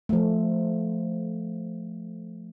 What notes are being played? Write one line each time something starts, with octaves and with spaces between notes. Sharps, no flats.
F3 A3